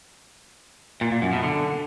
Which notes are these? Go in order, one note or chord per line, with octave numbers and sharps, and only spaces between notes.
A#2
A#2
F#2
B2
D3